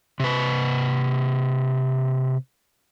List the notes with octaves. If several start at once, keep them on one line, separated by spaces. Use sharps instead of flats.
C3 B4